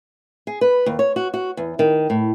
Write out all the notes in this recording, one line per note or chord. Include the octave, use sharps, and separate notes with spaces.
G#4
B4
D#2
C#5
F#4
F#4
E2
D#3
A2